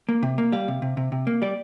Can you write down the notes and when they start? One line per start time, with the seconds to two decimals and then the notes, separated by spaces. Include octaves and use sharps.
0.09 A#3
0.23 C3
0.38 A#3
0.52 G3 F5
0.68 C3
0.82 C3
0.97 C3
1.12 C3
1.27 A#3
1.42 G3 D5